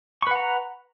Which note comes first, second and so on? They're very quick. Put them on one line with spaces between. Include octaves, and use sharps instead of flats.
C#6 B4 F#5 A#5